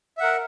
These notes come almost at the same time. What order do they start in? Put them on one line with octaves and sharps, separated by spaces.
E5 F#5 A#4